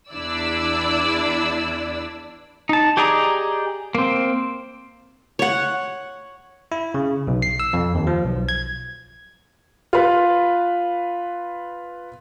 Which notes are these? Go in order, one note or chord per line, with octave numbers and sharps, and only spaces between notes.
E2 D4 E4 D5 E6
D#4 A5
G4 G#4 D5 D#5 A#5
A#3 C4
C#5 F#5
E4
C#3
B1
C7
E6
F2
D#2
F3
B1
G#6
F4 B4